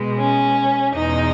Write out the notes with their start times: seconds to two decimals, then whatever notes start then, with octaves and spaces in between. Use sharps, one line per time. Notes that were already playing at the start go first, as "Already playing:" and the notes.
Already playing: B2 G#3
0.19 C#4
0.95 E2 B2 G#3 D#4